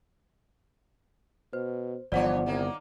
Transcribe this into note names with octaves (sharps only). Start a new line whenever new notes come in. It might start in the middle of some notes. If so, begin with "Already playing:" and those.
B2 C5
G1 D3 E3 F3 B3 C#5 D5 F#5
C2 D#3 A#3